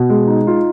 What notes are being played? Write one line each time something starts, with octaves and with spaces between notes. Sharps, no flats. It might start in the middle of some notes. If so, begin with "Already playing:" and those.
Already playing: B2
G#3
D#4
F4